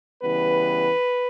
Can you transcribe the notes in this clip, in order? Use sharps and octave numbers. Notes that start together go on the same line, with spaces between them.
C#3 E3 G3 B3 B4